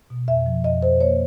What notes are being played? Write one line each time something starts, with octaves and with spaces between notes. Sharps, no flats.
B2
F2 E5
F3
F2 D#5
F2 C5
A#3 C#5